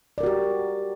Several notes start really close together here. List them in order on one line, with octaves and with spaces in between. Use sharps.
D5 A#4 F#4 G4